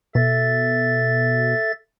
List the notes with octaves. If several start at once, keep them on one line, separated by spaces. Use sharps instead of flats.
B2 A4 E5 A6